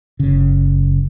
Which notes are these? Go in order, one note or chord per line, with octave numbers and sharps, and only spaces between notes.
F#1 C#3